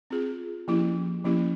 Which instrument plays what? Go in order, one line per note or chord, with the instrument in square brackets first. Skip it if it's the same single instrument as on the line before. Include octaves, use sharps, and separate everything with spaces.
[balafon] C4 F4 G#4
F3 A#3 C#4 E4 G4
F3 A#3 C#4 E4 G4